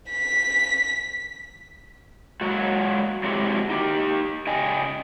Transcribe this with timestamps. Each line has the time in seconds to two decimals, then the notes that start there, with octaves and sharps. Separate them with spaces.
0.11 B6
2.41 F#3 G#3 A#3 F#4
3.24 F#3 G#3 C4 E4 F#4 G4
3.70 D#4 G4
4.47 C#3 D#5 G5 G#5